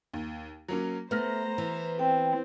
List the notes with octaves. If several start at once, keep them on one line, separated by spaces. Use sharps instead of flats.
D#2
F#3 A#3 C#4
A3 B3 C5 A#5 F6 A#6
E3
C4 G5